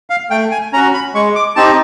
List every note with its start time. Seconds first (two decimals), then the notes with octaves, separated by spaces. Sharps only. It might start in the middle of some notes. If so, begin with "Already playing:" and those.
0.10 F5
0.30 A3 G5
0.51 G#5
0.73 C#4 A#5
0.76 F#4
0.94 B5
1.14 G#3 C#6
1.35 D6
1.56 C4 D#4 G4 A5